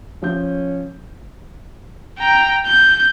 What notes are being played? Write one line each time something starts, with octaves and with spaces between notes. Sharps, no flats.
F3 C#4 G6
G5 A#5
G6